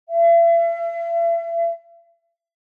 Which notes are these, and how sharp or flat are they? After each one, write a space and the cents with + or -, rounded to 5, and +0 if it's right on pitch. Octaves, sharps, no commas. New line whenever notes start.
E5 +40